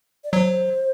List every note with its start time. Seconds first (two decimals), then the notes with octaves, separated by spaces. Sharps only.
0.24 D5
0.33 F#3 C5